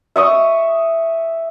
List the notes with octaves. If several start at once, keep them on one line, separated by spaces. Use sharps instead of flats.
E5 C#6 D#6